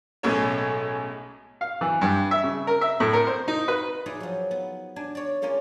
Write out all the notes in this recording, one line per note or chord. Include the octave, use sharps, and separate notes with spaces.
B1 A2 G#3 C#4 G#4 C#5
F5
E3
G2
E5
C#3
A#4
E5
A2
A#4
C5
D#4
B4
D#4 F4 G#4 A#4 D5 E5
F3 F#3
B3
D4 G#5
C#5 D5
G#3 A#3 C#4 F4 D5